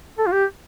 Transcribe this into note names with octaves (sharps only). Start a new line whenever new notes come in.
A4
F4
G4